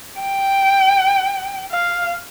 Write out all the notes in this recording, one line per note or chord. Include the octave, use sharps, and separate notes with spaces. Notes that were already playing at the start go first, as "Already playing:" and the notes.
G5
F5